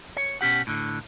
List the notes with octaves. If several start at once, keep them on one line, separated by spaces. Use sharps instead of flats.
C#5
B2 C#4 G4 F#5
A2 D3